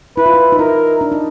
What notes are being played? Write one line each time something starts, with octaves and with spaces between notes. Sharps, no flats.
E4 B4
F4
E4
D#4
E4 A#4
D4
D#4